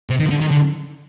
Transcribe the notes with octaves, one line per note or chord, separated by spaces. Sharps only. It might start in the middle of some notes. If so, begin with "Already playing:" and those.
C3
D#3
D3
D#3
D3